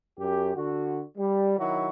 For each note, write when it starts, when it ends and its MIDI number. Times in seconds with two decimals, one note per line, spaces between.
0.18 0.50 42
0.18 0.50 67
0.55 1.02 50
0.55 1.02 66
1.16 1.57 55
1.58 1.90 51
1.58 1.90 54
1.58 1.90 64
1.58 1.90 66